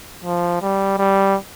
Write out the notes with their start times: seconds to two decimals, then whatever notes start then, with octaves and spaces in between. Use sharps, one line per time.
0.24 F3
0.61 G3
0.98 G3